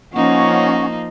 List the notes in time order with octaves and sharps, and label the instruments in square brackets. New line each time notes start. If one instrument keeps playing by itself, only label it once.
[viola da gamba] F3 A#3 D#4 [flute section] C#4 F#5 C#6